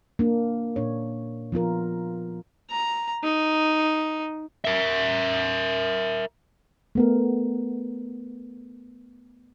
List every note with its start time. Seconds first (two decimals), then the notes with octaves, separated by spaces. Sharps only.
0.19 A#3 D4
0.76 A#2 D4 C#5
1.52 F3 B3 F4 A#4
2.70 A#5
3.24 D#4
4.65 A#4 E5
6.95 A3 B3 A#4